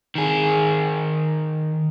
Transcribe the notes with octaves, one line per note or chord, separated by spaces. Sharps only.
D#3 G#4